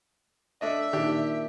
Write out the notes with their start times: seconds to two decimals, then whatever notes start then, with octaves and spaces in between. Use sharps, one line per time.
0.61 A3 D4 D#5 E5
0.93 A#2 D#3 D4 G4